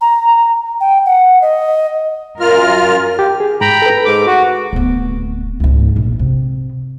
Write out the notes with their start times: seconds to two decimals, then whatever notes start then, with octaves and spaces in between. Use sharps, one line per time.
0.01 A#5
0.81 G5
1.06 F#5
1.42 D#5
2.40 F#2 F4 A#4 F6
3.19 G4
3.40 G#4
3.61 G#2 G5 A#5 B5
3.82 A4 B4
4.05 G#2 D6
4.27 F#4
4.73 D1 B3
5.60 C#2 G#2
5.96 A#1
6.19 C3